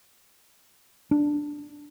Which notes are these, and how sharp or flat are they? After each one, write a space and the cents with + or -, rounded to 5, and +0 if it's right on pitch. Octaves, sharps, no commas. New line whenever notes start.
D4 +5